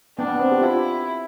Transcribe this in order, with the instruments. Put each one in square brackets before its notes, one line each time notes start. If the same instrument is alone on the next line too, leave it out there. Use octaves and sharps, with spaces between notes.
[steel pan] B3 [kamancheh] D4
[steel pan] B3
C4
G4
[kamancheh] E4 [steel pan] F4